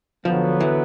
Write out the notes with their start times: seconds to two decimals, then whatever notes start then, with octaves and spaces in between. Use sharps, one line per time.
0.25 D3 F3 F#3 B3
0.60 E3